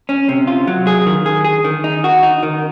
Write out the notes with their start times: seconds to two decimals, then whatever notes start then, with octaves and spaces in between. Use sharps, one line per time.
0.09 C#4
0.29 C3
0.47 F4
0.67 F#3
0.87 G#4
1.06 D#3
1.26 G#4
1.44 G#4
1.64 D#3
1.84 D#4
2.04 F#4
2.23 D#4
2.43 D#3